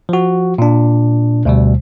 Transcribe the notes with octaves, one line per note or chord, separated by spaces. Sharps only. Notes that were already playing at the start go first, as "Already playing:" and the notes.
F3 F#4
A#2 D4
D2 B2 G3